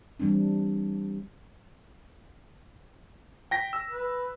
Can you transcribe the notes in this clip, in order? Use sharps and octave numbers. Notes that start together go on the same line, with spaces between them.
E3 G3 C4 D4
G5 A#6 B6
E6
B4